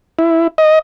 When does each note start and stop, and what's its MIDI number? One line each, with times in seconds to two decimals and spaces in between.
0.19 0.47 64
0.58 0.79 75